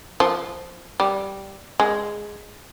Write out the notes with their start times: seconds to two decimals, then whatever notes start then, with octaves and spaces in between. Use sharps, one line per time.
0.20 F3
1.00 G3
1.80 G#3